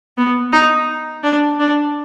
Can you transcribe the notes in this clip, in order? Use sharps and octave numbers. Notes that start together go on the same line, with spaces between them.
B3
D#4
D4
D4